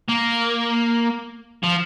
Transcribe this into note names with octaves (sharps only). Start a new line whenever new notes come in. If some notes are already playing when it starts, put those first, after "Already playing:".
A#3
F3